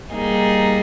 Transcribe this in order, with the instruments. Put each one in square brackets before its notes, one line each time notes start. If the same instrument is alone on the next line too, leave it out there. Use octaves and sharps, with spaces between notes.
[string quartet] G3 A#3 D#4 G#4